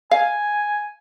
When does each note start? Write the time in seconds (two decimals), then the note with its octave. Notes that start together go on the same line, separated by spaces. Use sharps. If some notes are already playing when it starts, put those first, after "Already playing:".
0.11 F5 G#5